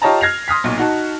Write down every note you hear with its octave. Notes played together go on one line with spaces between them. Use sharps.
F4 G4 C#5 D#5 A5 A#5
F6 G#6 A#6 C7 F7
C6 D#6 F6 B6
B1 A#2
D#4 F#4 A5